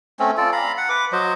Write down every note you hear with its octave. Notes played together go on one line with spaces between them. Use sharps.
A3 C4 C#4
F4 A4 D5
F5 A#5 B5
F#5
B4 D6
F#3 C5 D#5